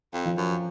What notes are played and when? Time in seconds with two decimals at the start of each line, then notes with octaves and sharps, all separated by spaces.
0.13 F2
0.26 F3
0.38 F#2